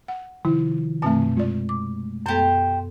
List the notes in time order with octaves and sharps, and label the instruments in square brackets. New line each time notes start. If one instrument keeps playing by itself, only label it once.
[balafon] F#5
[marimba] C3 [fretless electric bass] D#3 F3 [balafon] E4
[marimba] F#2 B2 [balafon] A3 C4 A5
[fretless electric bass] G#3 A3 [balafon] F4 D5
[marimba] D6
[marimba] F#2 B3 A4 [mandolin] G4 C5